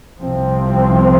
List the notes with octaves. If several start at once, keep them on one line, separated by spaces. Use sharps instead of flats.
C2 C3 F3 C4